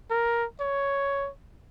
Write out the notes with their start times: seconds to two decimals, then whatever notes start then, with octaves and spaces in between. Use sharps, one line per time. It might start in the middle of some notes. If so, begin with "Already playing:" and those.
0.10 A#4
0.60 C#5